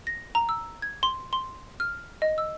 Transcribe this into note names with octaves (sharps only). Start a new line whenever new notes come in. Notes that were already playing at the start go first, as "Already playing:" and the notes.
A#6
A#5
E6
G#6
C6
C6
F6
D#5
E6